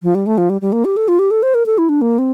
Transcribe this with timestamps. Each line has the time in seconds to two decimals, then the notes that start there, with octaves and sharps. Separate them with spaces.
0.03 F3
0.15 G3
0.26 A3
0.38 F3
0.50 G3
0.61 G3
0.72 A#3
0.85 G4
0.97 A4
1.08 F4
1.19 G4
1.31 A4
1.43 C5
1.55 A#4
1.66 A4
1.78 E4
1.89 D4
2.02 A#3
2.19 C4